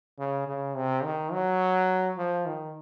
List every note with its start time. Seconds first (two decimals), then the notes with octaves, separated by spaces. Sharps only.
0.19 C#3
0.47 C#3
0.76 C3
1.04 D#3
1.32 F#3
2.18 F3
2.46 D#3